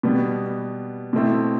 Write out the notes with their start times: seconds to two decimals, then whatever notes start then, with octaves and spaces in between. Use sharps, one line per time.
0.03 B2 G3 B3
1.13 B2 A3 C4 E4